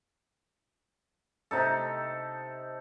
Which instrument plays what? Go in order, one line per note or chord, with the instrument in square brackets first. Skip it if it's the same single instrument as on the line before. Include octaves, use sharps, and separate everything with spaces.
[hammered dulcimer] C3 D#4 A4